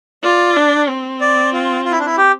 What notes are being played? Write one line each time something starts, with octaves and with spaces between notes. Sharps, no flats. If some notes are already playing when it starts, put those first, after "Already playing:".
F4 D5
D4
C4
D5
F4
F4
E4
D4
E4
G4